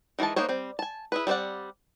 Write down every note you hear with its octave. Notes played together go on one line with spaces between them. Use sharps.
D#3 E3 G#3 G#5 A5
A#3 B3 D#4 C5 C#5
G3 C4
G#5 A5
E4 G#4 B4
G3 C4 C5 D5 F#5